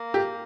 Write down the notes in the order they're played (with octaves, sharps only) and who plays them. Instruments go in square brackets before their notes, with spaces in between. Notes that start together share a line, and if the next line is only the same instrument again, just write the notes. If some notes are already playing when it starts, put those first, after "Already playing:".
Already playing: [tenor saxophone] A#3
[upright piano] G4